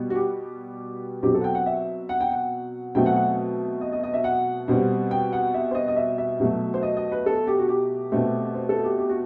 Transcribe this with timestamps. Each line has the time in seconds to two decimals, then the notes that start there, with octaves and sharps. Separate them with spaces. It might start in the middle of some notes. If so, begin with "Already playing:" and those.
Already playing: B2 G3 B3
0.10 F#4
0.15 G4
1.23 B2 F#3 C4 G4
1.34 A4
1.41 F#5
1.44 G5
1.55 F#5
1.66 E5
2.09 F#5
2.21 G5
2.32 F#5
2.95 B2 F#3 A3 C4 G5
3.06 F#5
3.16 F#5
3.81 D#5
3.93 D#5
4.03 D#5
4.14 E5
4.24 F#5
4.68 B2 G3 C4
5.11 G5
5.33 F#5
5.54 E5
5.71 C5
5.75 D#5
5.88 D#5
5.96 E5
6.18 E5
6.40 B2 F#3 A3
6.74 C5
6.83 D#5
6.97 D#5
7.12 B4
7.26 A4
7.47 G4
7.59 F#4
7.68 G4
8.12 B2 A3 C4
8.54 C5
8.69 A4
8.84 G4
8.98 G4
9.09 F#4